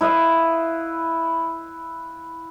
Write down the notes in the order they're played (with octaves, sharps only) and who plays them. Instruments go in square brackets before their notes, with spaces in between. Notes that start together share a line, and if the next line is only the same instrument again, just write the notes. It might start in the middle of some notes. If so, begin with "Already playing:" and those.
[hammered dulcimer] E4 B4 D#5 F5